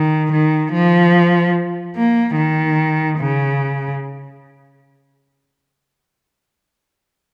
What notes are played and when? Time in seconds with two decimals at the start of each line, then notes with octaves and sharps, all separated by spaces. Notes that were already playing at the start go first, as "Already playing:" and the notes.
Already playing: D#3
0.32 D#3
0.73 F3
1.96 A#3
2.37 D#3
3.18 C#3